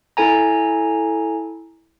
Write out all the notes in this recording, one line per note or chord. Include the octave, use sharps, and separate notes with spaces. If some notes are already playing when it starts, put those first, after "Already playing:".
E4 A4 G#5 A#5